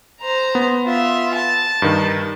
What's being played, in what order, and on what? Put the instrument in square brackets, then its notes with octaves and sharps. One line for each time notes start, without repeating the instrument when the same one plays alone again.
[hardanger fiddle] C5 A#5
[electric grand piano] B3
[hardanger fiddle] F4 E5
A5
[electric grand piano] G2 D#3